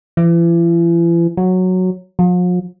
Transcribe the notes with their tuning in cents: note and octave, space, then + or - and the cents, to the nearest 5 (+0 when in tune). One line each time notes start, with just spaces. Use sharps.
E3 +40
F#3 -5
F3 +45